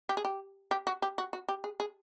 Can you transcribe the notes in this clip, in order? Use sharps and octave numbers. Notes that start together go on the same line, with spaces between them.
G4
G#4
G4
G4
F#4
G4
F#4
F#4
G4
G#4
G#4